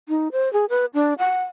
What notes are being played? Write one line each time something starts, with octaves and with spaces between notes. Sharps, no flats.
D#4
C5
G#4
B4
D4
F#5